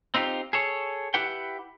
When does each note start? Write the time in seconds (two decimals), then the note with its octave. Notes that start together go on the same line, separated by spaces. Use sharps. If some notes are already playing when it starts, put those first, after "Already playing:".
0.14 C4 D#4 F4 G4
0.53 G#4 A4 C#5
1.14 E4 G4 B4 F#5 G5